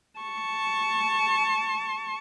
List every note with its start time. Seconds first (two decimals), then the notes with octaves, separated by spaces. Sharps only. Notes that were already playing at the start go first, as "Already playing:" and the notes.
0.20 A5 C#6